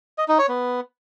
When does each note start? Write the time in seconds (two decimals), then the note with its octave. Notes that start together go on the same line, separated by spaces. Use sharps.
0.18 D#5
0.28 D#4
0.39 C#5
0.49 B3